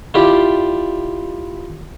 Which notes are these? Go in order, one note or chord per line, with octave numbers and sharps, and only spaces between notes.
E4 F4 G4 D5